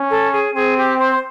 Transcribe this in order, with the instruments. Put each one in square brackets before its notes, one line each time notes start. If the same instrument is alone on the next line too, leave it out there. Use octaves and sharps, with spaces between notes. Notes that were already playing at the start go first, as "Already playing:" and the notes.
Already playing: [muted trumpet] C#4
[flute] A4
G#4
[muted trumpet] C4 [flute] G#4
[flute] G4
C5